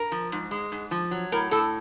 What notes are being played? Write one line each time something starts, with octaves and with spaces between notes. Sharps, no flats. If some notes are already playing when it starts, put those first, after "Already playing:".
Already playing: A#4
F3
G#2
G#3
G#2
F3
F#3
A2 A#4
A2 A4